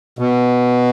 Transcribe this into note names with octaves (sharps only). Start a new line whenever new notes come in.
B2